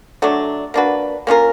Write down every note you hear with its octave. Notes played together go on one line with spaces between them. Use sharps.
F#3 A3 D4
A#3 D4 F#4 B4
A#3 C#4 F4 A#4